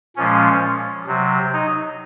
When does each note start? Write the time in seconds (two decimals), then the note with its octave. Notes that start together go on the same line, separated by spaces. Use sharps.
0.16 A#2 F3 G#3 C#4
1.07 C3 F#3
1.52 D#4